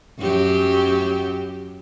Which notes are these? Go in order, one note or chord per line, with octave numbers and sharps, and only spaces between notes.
F#2 F#3 G4